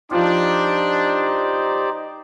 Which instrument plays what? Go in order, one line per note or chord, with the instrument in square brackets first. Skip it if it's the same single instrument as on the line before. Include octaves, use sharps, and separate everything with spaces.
[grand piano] F3 F4 [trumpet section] D4 [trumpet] D#4 [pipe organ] G4 C5 D5